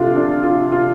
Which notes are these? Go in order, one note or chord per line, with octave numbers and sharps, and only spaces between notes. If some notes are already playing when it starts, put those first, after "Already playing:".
Already playing: C3 D4 F4 A4
D4
F4
F4